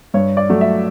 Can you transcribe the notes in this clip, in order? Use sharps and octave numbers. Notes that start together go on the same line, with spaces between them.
G2 C#5
D5
F#3 A3
E5